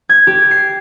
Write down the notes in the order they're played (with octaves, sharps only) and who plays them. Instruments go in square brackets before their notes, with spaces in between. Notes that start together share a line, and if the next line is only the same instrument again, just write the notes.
[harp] G#6
G4
C7